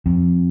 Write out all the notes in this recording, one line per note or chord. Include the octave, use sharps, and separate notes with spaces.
F2